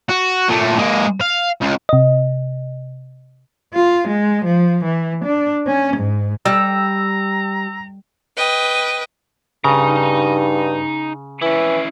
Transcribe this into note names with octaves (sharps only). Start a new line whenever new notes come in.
F#4
A#2 A3
G#3 A#3
F5
C#2
C3 D#5
F4
G#3
F3
E3
D4
C#4
G#2
G3 A#5 E6
B4 D#5 G5
G2 C#3 D#4 A#5
E3 C#4 E4